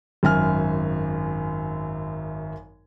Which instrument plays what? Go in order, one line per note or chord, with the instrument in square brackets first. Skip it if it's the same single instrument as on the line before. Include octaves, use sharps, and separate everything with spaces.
[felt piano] G#1 F#2 G#5 F6